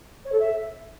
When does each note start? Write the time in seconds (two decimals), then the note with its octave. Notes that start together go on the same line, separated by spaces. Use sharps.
0.25 C#5
0.32 A4
0.39 E5